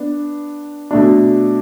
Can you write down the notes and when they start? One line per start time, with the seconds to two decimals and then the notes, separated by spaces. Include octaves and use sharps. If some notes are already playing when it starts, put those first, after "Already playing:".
Already playing: B3 D4
0.91 B2 A3 D4